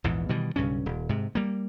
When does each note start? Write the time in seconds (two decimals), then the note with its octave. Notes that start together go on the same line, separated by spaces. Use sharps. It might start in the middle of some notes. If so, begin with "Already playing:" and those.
0.04 A#1 E2 G#2 E3
0.29 B2 D#3 E3 G3
0.56 B1 G2 C#3 C#4
0.86 D#1
1.09 G#2 C3
1.35 G3 A#3